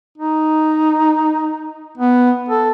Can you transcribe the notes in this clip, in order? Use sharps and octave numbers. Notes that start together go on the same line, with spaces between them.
D#4
B3
A4